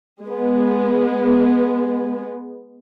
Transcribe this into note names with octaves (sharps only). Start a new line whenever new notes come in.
G#3 B3